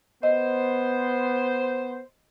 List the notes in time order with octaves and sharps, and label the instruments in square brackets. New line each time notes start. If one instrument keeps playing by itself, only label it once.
[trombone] B3 [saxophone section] C5 [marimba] D#5